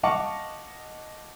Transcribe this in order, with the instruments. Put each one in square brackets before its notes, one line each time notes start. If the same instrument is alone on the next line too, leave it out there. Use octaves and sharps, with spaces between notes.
[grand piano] D#5 F5 F#5 A5 C#6 D6